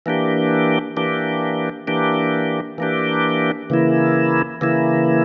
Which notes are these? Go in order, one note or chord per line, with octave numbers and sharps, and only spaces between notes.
E3 A#3 D4 G4
E3 A#3 D4 G4
E3 A#3 D4 G4
E3 A#3 D4 G4
C#3 E3 A#3 E4
C#3 E3 A#3 E4